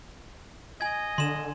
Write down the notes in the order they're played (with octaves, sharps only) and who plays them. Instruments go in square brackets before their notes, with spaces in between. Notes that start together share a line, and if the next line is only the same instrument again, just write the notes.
[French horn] D#5 [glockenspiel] G#5 G#6
[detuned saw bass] D3 [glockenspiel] C6 E7